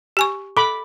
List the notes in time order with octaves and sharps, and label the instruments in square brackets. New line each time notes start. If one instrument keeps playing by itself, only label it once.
[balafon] G4 G#5 C#6
[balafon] A4 [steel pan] B5 D6